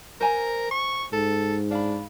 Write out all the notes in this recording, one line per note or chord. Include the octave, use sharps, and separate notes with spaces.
A#4 C5 G#5 A#5
C#6
G#2 A4
D4 F5 B5